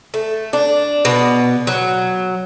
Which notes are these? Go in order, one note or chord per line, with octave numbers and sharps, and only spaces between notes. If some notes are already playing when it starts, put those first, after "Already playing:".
A3
D4
B2
F#3